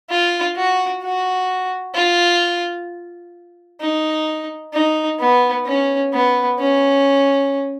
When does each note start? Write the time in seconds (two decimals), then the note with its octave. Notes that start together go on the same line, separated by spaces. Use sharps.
0.10 F4
0.56 F#4
1.03 F#4
1.95 F4
3.80 D#4
4.73 D#4
5.19 B3
5.66 C#4
6.13 B3
6.59 C#4